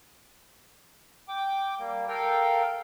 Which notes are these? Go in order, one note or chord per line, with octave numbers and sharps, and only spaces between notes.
G5 D6
G3 A#3
A4 A#4 F5 G5